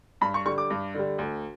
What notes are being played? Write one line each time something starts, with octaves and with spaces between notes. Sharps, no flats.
G2 B5
C#6
D3 G3 C#6
D6
G2
D3 G3
D2